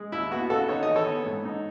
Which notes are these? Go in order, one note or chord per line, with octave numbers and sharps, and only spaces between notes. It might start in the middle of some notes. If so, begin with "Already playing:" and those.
Already playing: G#3
D#2 E4
B3 F#4
C#3 F#4 A4
D#4 C#5
D#5
E3
A4 C#5
B3
G#2
D#4